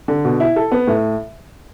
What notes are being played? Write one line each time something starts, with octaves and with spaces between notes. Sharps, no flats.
D3
B2
E4
A4
B3
A2